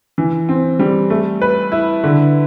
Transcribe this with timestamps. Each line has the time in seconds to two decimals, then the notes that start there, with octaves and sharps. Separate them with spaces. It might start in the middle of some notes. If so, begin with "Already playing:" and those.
0.18 E3
0.49 C4
0.79 G3
1.10 A3
1.41 B4
1.72 E4
2.04 D3